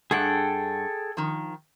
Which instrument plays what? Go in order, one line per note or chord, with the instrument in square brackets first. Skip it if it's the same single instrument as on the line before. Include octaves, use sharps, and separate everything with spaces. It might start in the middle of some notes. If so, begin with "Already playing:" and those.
[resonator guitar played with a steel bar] G2 F#5 [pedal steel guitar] G#4 A4 G5
[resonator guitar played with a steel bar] D#3 F3